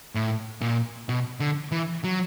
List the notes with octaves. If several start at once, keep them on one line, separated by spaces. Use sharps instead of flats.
A2
A#2
B2
D3
E3
F#3